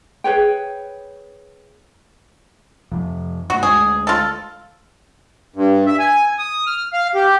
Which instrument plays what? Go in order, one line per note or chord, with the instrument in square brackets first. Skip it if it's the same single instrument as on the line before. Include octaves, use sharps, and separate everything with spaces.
[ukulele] G#4 B4 C#5 G5
[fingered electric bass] F2 C3 F3
[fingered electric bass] G2 A3 [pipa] F#4
[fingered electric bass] D2 G#3 [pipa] G#4
[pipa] F4 A4
[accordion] G2
E5
G#5
D#6
F6
F5
G4